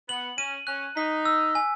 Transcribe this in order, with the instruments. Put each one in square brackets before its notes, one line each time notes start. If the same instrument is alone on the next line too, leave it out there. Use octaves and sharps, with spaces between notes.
[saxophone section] B3 [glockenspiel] F#7
[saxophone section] C#4 [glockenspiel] D#7
[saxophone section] C#4 [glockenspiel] F#6
[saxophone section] D#4 [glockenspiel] B6
[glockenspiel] E6
G#5